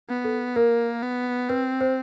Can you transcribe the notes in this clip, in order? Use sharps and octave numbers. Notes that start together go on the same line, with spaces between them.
B3
A4
A#3 A#4
B3
C4 B4
C5